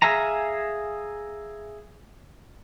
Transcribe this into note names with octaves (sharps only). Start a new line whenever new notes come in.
G#4 E5 F5 G#5 A#5